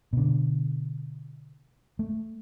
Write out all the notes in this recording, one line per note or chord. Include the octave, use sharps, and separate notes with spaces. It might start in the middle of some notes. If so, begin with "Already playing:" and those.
B2 D3
A3